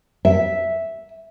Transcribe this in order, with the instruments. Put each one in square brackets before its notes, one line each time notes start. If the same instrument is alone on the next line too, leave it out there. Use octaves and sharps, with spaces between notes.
[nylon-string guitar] E5